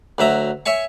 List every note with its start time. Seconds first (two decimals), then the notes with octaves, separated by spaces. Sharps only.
0.18 D2 F#3 E5 A#5
0.66 C#5 E5 G#5 C#6